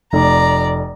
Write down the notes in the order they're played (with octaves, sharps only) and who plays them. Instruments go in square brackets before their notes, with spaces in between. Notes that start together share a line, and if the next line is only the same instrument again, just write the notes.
[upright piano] F1 [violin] D5 A#5